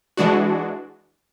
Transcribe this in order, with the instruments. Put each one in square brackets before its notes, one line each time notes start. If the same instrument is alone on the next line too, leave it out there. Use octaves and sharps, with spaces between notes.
[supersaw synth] E3 G#3 D4 F#4